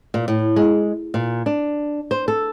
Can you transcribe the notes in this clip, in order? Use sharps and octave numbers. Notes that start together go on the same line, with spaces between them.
A#2
A2
G#3
A#2
D4
C5
A4